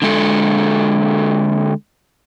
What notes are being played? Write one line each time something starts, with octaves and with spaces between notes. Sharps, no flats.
D3 G#3 A4